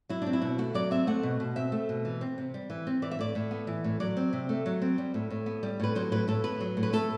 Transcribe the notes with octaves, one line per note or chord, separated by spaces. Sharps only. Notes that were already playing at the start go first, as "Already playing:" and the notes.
F#3 E4
C4 D4
E4
B2
A3 F#4
F#3 D5
C4 E5
A3 F#5
B2
B2
C4 E5
A3
B2
E3
C4
C3
G3
E3
C4
E3 D5
E5
A2 D5
A2
B3
E3
A2
F#3 D5
C4
C3
A3
F#3
C4
G3
A2
A2
B3
G3
A2 B4
F#3 C5
A2 B4
A2 A4
B3 B4
F#3
A2
B4
A3 A4